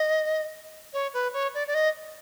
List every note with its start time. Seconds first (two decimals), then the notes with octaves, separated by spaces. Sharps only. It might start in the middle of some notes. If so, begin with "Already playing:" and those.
Already playing: D#5
0.93 C#5
1.14 B4
1.33 C#5
1.54 D5
1.67 D5
1.74 D#5